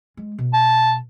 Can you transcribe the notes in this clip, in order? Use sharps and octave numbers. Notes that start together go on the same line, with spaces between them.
G#3
B2
A5